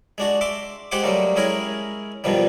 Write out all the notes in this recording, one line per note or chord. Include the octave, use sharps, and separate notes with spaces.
G#3 D4 F#4
E5 C6 D6
G#3 G4 C5 F#5 C6 D6
F#3 G3 A3 A#3 D#4
G#3 C#4 E4 G#4 A#4
G2 B2 D#3 F3 G3